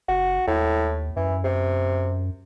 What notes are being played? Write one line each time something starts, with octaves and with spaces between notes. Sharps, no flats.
F#1 F#4
D#2 A2
F#2 E3
C3